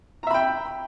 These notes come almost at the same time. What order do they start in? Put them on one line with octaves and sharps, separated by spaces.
A#5 E5 B5 G5